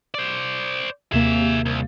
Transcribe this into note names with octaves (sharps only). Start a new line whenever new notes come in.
C5 D5
D#2 C3 A#3 G#4 E5
C2